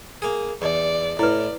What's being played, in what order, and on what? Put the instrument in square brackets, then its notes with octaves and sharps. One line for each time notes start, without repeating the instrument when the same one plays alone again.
[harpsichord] A#3 G#4
[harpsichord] E2 [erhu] D5
[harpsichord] A2 [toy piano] E4 B4 [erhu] D5